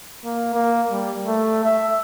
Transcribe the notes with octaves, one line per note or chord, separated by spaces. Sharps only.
A#3
A#3
G3
A3
E5